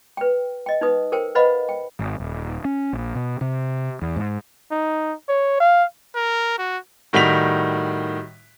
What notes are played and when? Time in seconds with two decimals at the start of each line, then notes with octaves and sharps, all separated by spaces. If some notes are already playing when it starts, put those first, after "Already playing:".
0.17 B4 G5
0.66 D#5 G5
0.81 D#4 B4 D#6
1.12 A4 A#4 C5 G5
1.35 B4 C5 D#5 F5 F#5 B5
1.69 G5
1.99 G#1
2.20 D#1
2.65 C#4
2.93 A#1
3.15 B2
3.41 C3
4.02 E2
4.16 G#2
4.71 D#4
5.29 C#5
5.60 F5
6.16 A#4
6.59 F#4
7.13 A2 D#3 G3 F#4 B6 F7